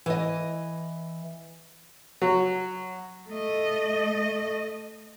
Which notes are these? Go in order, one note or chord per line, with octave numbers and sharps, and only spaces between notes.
E3 D#5
F#3
A3 D#5